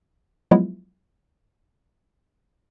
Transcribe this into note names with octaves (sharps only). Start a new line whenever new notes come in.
F3 F#3 G#3 B3 E4 F4